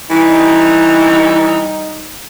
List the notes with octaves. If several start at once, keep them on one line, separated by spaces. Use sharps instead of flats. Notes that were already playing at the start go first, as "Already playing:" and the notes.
E3 G3 D#4